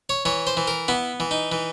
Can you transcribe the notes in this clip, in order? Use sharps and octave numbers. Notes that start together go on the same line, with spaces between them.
C#5
E3 C#5
C5
E3
A#4
B3 E4
E3
D#4
E3